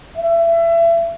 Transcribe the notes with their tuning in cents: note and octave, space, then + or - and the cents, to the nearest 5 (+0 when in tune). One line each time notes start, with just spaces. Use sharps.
E5 +30